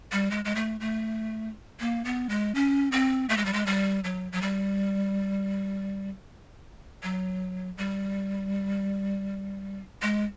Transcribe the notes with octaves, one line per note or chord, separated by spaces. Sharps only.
G3
G#3
G#3
A3
A3
A#3
B3
G#3
C#4
C4
A3
G#3
G3
G#3
G3
F#3
F#3
G3
F#3
G3
G#3